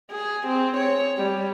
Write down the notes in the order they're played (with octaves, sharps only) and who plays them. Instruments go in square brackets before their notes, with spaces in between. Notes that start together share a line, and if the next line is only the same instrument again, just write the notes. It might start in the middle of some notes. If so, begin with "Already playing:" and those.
[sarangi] G#4
C4
C#5
G3